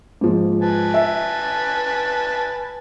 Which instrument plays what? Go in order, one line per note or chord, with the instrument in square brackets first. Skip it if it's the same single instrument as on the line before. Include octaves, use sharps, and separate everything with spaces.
[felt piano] G#2 F3
[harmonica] B4 G#5 A5
[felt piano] E5